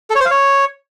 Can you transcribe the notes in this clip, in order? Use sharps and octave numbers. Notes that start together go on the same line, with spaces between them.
A4
C#5
C5
F5
C#5